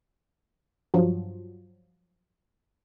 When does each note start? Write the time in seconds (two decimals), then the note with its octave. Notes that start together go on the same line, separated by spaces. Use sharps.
0.94 G2 F3 F#3